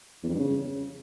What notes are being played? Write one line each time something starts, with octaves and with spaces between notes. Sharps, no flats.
E2
F2
G2
C#3